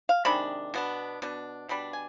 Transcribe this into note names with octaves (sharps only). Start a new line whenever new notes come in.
F5
C3 D#3 G#3 D4 B5
B2 B3 D4
B2 B3 D4
B2 G3 D4 B5
G#5